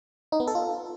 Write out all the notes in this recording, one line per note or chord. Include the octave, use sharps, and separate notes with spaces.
D#4
B3
A4
F4